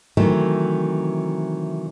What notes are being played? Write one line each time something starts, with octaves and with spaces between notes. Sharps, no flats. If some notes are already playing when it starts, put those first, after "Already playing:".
C3 D#3 E3 F#3 A3